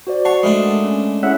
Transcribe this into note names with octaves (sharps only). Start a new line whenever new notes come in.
F#4 C5 D5
C#5 F#5 A5 C7
G#3 A3 D4 A#4 B5 D#6
C#4
C#4 E4 G#4 E5 F#5 F#6